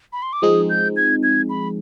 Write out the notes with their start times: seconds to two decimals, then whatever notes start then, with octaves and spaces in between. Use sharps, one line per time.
0.13 B5
0.22 C6
0.33 D6
0.42 F3 G#3 C4 D#4 G#4 D#6
0.69 G6
0.96 G#6
1.23 G#6
1.49 B5